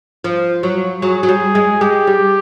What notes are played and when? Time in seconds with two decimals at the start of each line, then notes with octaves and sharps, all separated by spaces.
0.24 F3
0.63 F#3
1.02 F#3 G#4
1.23 F#3
1.29 G3
1.55 G#3
1.81 G#3 G4
2.07 G3